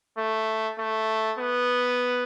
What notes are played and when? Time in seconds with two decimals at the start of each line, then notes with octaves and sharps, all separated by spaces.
0.18 A3
0.78 A3
1.38 B3